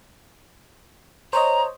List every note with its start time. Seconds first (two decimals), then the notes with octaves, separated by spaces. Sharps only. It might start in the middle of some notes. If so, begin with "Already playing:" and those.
1.33 C5 C#5 D#5 A#5